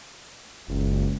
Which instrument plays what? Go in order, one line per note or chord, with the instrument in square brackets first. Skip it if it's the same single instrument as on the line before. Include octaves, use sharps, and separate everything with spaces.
[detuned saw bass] F#1 [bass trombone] C#2